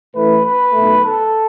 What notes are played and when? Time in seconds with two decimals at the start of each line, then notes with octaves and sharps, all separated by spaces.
0.14 A1 A2 E3 A3 B4
0.44 B4
0.73 B1 B2 A3
1.03 A4